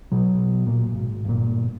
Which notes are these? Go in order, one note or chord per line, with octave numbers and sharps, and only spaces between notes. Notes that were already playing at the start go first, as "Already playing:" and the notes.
B2 F#3
A#2
G#1
G1 A#2